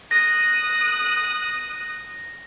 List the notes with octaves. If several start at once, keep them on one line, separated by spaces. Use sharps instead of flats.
D#6 F#6 A#6